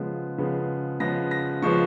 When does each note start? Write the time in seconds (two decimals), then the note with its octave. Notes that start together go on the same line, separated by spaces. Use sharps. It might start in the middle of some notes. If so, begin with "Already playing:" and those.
Already playing: C#3 F3 G#3 B3
0.38 C#3 F3 G#3 B3
1.00 C#3 F3 G#3 B3 A#6
1.31 A#6
1.62 C#3 F3 G#3 B3 C#6